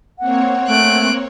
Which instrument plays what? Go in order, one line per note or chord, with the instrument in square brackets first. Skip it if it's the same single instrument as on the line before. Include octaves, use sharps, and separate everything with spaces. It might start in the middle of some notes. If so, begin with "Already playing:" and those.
[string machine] A#3 C4 C#5 [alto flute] F#5
[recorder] A3 [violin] F#6 D7